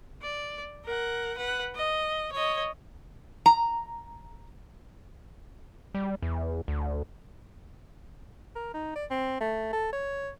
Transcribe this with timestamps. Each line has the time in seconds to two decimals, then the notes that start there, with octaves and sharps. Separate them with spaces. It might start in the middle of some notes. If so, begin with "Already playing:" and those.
0.22 D5
0.85 A#4 F#5
1.36 B4 F#5
1.75 D#5
2.32 C#5 D#5
3.46 A#5
5.95 G3
6.22 E2
6.68 D2
8.56 A#4
8.74 D#4
8.96 D5
9.10 C4
9.41 A3
9.73 A4
9.93 C#5